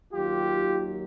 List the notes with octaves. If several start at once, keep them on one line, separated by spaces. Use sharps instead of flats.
D#2 D#3 F#3 F4 G4